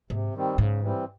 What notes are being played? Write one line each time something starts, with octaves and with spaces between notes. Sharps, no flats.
G#2 C3
D#3 G3 C4
G#2 C#3
E3 G3 C4